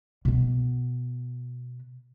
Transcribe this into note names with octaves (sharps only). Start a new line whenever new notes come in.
B2 B3